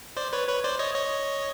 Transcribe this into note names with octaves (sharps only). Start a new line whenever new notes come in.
C5 D5
B4 C#5
B4 C#5
C5 D5
C#5 D#5
C#5 D#5